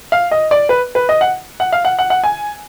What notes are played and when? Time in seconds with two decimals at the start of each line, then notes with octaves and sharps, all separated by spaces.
0.12 F5
0.31 D#5
0.51 D5
0.69 B4
0.95 B4
1.09 D#5
1.21 F#5
1.60 F#5
1.72 F5
1.85 F#5
1.99 F#5
2.10 F#5
2.24 G#5